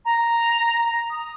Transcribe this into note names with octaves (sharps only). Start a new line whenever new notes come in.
A#5
D#6